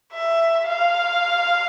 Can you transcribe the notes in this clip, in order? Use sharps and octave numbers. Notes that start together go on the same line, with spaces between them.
E5
F5